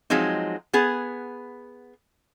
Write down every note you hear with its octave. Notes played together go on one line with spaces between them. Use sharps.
F3 F#3 G#3 C4 D#4
B3 G#4 F#5